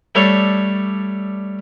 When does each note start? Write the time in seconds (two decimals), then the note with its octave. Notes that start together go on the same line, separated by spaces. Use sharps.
0.15 G3 A3 D4 A4 C#5